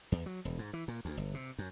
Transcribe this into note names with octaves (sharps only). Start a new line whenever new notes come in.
E2
F#3
E1
G#2
E3
A#2
D2
G1
C3
F#2